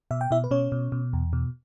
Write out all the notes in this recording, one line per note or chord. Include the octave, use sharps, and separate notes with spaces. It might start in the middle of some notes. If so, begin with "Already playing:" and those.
B2 E5
G5
B2 E4 E5
B4
B2 C#4 C#5
B2
B2
E2
B2